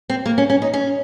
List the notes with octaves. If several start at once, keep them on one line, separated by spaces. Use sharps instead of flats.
C4
A#3
C#4
C#4
D#4
C#4